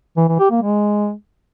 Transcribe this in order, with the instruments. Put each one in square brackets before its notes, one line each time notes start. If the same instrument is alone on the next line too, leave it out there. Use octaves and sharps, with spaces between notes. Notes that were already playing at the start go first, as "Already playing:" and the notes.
[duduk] E3
E3
G4
A#3
G#3